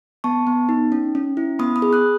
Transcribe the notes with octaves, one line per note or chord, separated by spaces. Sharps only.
B3 A5 C#6
B3
D#4
C#4
C#4
E4
B3 B5 D#6
B5 D#6
G#4
D#6 F#6